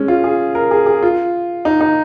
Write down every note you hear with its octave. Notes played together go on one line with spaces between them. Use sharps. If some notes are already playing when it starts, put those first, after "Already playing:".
Already playing: G#3 C#4
F4
G#4
A#4
G#4
G#4
F4
D#4
D#4